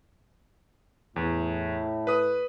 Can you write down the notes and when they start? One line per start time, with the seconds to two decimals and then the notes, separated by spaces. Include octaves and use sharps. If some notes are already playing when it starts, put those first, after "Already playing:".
1.16 E2 A2
2.07 B4 D#6